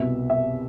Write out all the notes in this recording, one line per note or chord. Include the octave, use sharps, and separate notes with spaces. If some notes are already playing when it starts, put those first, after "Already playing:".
Already playing: C2 B2 E5
E5